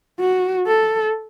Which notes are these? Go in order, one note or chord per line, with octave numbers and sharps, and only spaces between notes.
F#4
A4